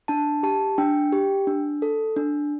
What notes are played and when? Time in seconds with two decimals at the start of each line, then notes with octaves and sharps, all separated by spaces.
0.08 D4 A5
0.43 G4 A5
0.78 D4 G5
1.12 G4
1.47 D4
1.82 A4
2.17 D4